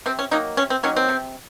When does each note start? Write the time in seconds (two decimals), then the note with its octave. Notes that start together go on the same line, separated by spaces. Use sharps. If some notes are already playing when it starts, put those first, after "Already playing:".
0.06 C3 C4
0.19 C#4
0.31 D#3 F#3 A#3 D#4
0.57 C3 C#4
0.70 C4
0.83 D#3 F#3 A#3 C#4
0.96 C4
1.09 C3